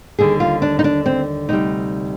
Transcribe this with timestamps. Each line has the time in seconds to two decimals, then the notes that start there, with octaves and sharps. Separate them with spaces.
0.19 D#2 D3 G3 G#4
0.40 F4
0.62 D4
0.79 D#4
0.84 D4
1.06 C4
1.49 D2 C3 G3 D#4